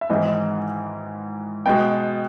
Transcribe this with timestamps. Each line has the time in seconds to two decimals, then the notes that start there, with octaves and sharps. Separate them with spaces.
0.01 E5
0.09 G#1 G#2 E3 G#3 C4 D#5
1.66 B2 G#3 B3 G5